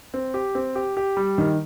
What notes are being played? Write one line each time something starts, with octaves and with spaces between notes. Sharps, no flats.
C4
G4
C4
G4
G4
G3
D#3